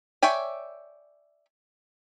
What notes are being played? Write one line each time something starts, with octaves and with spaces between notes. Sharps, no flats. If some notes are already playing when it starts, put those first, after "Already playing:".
C#5 D5 E5 G5 G#5